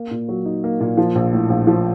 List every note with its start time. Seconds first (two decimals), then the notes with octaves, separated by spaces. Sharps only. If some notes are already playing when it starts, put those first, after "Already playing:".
Already playing: A#3
0.11 A#2
0.29 F#3
0.45 D#4
0.64 A#3
0.80 A#2
0.97 F3
1.15 A#1
1.33 A2
1.50 A#1
1.67 F3